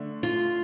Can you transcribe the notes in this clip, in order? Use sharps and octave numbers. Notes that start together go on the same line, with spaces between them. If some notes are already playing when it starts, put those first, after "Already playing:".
Already playing: D3 A3 D4
F4